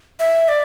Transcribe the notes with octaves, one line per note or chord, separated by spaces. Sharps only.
E5
D5